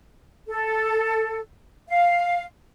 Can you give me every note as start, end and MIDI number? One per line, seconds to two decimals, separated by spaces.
0.49 1.40 69
1.88 2.43 77